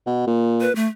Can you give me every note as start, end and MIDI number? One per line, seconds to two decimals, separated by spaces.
0.06 0.23 47
0.27 0.68 46
0.61 0.74 71
0.75 0.87 57